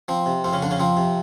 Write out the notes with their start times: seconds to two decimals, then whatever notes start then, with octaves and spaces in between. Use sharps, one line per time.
0.08 F3 C4
0.26 C3
0.44 F2 C4
0.53 C#3 C#4
0.62 F2 D3 D4
0.71 C#3 C#4
0.80 F3 C4
0.97 C3